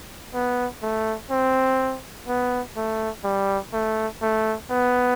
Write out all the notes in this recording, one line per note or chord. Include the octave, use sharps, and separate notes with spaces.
B3
A3
C4
B3
A3
G3
A3
A3
B3